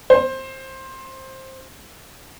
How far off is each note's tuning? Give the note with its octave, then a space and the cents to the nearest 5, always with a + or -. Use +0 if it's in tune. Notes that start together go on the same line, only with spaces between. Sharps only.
C5 +15